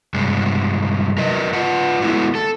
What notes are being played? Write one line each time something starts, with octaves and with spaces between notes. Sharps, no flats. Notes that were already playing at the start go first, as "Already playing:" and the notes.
G2 C3 G3 G#3
F#3 A#4 B4 D#5
F4 B4 F#5
G#3 A3 B3 C#4 E4 F#4
A4